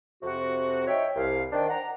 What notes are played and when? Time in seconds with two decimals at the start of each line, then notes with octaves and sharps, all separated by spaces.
0.22 F2 C3 F#4
0.88 D#4 C#5 E5 G5
1.16 C2 F5
1.52 D#3 D4 C5 G5
1.69 F#5 A#5